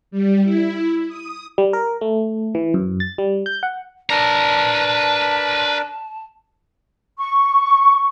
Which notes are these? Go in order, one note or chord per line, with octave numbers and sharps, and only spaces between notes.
G3
E4
D#6
G3
A#4
A3
E3
F#2
A6
G3
G6
F#5
D4 A#4 B4 D5 A5 A#5
C#6